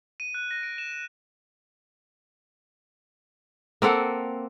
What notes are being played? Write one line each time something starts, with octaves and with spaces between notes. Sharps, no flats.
D#7
F#6
A#6
D7
E7
A#6
A#3 C4 A4 F#5